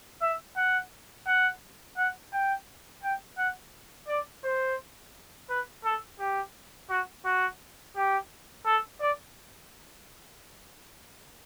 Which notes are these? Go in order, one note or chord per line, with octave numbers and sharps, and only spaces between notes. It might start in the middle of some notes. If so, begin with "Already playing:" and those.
E5
F#5
F#5
F#5
G5
G5
F#5
D5
C5
B4
A4
G4
F#4
F#4
G4
A4
D5